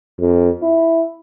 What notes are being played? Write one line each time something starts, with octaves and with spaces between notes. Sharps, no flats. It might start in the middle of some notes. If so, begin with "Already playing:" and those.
F2
E4